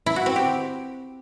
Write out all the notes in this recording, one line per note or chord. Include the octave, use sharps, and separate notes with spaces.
E4
F#4
C4
G4